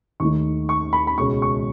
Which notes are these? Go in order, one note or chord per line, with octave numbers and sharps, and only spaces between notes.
D#2 D#3 A3 D#4 C#6
C#6
B5
B5
C#2 B2 G#3 C#4 C#6
C#6